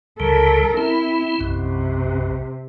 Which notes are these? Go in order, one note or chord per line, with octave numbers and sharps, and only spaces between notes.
C#2 C#3 G3 A4 A#4
C4 E4
B1 F#2 C3